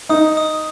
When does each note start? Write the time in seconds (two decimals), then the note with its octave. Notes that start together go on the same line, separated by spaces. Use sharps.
0.09 D#4 D#6
0.37 D#6